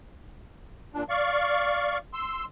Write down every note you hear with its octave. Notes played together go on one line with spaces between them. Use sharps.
A#2 D4
D5 F5 C#6
C6 E6